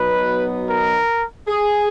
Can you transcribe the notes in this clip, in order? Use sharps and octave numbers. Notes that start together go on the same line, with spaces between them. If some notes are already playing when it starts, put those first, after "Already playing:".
Already playing: B2 F#3 B3 D#4 B4
A#4
G#4